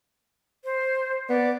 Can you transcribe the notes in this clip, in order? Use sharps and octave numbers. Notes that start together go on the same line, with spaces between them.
C5
B3 D5